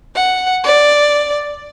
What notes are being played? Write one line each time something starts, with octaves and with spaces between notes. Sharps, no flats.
F#5
D5